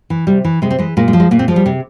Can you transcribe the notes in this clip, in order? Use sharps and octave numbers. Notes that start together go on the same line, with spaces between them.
E3
C3 G3
E3
C3 G#3
C4
E3 G#3
A#2 G#3
G#3
F3
G#3
A#2 A#3
C4
F3 G#3
G3
C3